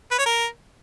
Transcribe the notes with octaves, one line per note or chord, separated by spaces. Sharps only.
B4
C#5
A#4